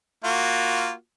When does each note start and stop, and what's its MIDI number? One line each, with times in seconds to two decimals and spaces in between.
0.24 0.93 58
0.24 0.93 65
0.24 0.93 66